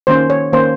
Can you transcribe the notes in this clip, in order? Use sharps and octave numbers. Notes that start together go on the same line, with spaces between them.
D#3 A#3 C#4 C5
C#5
D#3 A#3 C#4 C5